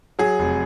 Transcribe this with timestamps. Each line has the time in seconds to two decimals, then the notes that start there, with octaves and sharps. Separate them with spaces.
0.19 F#3 G#4
0.39 F1